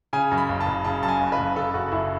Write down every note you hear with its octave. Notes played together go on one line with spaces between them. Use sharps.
C#3 G#5
F#2
B5
F#1
A5
F#1
C#3 A5
F#2 A5
G#5
F#1
B4
F#1
C#3 A4
F#2 F#4
F#1 E4